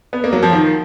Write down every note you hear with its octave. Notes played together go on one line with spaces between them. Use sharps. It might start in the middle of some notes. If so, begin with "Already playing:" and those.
B3
A#3
F#3
F3
D#3